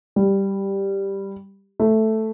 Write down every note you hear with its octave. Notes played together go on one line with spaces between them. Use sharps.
G3
A3